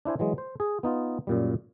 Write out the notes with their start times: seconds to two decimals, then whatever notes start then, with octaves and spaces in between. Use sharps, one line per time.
0.05 D4 E4 C5 G#5
0.19 E3 F#3 G#3
0.38 C5
0.60 G#4
0.83 B3 D#4 F4
1.27 F#2 A#2 G3